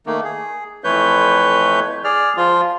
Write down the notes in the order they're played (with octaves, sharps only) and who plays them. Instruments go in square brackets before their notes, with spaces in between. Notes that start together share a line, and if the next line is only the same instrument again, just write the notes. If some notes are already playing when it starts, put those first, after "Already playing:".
[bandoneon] D#3 A3 A#3
G#4
F2 E3 A3 B4 C#5 G6
G#4 D5 F6
F3 F4